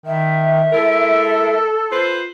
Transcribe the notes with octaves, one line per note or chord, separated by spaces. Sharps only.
D#3 E5
G#3 E4 A4 A#4
F4 B4 C5